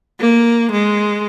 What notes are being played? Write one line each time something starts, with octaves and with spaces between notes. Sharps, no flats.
A#3
G#3